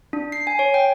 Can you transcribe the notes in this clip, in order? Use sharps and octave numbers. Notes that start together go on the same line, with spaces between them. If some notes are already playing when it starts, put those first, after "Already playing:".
D4
C7
G#5
C#5
G5